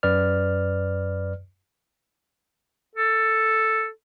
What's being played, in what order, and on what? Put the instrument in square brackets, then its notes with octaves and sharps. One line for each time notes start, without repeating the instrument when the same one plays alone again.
[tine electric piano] F#2 B4 D5 F6
[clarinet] A4